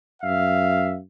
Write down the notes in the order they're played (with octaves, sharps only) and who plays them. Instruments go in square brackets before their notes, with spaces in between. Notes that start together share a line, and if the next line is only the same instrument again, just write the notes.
[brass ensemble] F#2 E5 F5